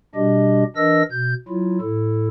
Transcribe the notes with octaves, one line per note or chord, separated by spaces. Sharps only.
B2 G3 D4 G4 D#5
E3 D4 A#4 D#5 E6 A#6
B2 G6
F#3 E4 F4
A2 E4 A4